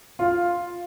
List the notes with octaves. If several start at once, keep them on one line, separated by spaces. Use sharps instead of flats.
F4